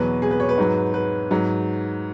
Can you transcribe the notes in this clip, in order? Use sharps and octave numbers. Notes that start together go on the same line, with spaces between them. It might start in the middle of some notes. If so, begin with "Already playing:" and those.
Already playing: E2 B2 F#3 B4
G#4
B4
C#5
B4
G#2 F#3
B4
G#2 F#3